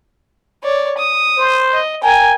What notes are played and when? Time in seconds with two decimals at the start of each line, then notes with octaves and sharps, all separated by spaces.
0.64 C#5 D5
0.98 D#6
1.37 C5
1.73 D#5
2.03 A#4 G5 G#5